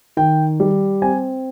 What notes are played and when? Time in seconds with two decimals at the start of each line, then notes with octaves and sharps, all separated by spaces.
0.17 D#3 G5
0.60 G3
1.02 C4 G#5